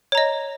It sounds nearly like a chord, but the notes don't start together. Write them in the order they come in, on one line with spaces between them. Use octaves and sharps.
C#5 A#5 D#5